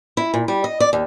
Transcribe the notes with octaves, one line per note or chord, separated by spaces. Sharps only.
E4
A#2
G3
D#5
D5
D#2